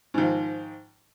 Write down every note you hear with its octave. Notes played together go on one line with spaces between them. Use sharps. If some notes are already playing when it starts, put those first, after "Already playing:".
G#2 D#3 F3